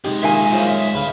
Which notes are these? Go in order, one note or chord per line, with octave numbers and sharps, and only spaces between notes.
F#2 C3 G#3 D#4 G4
A#2 D#3 E5 G#5
E4 F4 C5 C#5 F5
E5
C#2 G#2 D3 B4 F5